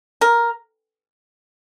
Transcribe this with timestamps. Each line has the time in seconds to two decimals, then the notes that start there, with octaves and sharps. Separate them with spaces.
0.21 A#4